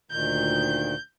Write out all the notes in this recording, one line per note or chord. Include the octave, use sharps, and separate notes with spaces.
D2 A#2 D#3 G6